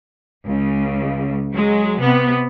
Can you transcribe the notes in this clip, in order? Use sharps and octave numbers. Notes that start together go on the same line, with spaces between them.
C#2 C#3
F#3 G#3
C3 B3